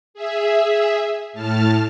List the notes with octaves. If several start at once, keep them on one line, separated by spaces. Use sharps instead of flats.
G#4 E5
A2 A5 F6